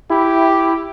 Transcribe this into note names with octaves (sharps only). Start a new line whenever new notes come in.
E4 G4